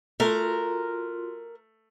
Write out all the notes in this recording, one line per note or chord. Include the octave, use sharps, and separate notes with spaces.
A3 F4 F#4 A#4 C6